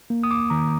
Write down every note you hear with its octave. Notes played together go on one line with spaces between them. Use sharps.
A#3
D#6
D6
D#3 A#5